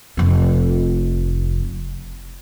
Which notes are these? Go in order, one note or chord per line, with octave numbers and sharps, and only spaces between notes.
F1 C4